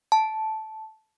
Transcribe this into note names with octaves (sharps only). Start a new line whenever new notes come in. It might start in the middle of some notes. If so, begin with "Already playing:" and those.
A5